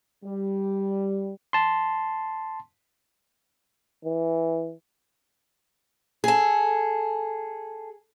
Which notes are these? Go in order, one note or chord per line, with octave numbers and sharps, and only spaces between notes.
G3
A5 C6
E3
G#4 A4